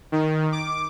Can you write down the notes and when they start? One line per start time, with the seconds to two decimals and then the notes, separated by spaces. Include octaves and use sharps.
0.12 D#3
0.52 D6